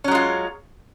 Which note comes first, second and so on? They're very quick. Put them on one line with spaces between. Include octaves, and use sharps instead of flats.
C#4 F#3 G#3 F4